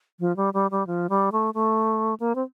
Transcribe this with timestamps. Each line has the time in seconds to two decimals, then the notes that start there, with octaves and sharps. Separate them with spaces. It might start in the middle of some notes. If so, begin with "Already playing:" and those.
0.20 F3
0.37 G3
0.54 G3
0.71 G3
0.87 F3
1.09 G3
1.32 A3
1.54 A3
2.20 A#3
2.35 C4